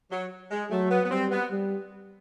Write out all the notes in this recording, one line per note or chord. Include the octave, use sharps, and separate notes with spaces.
F#3
G#3
F#3 A3
B3
B3
G3 C4
B3
G3